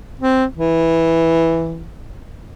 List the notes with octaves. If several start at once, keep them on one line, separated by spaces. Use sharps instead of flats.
C4
E3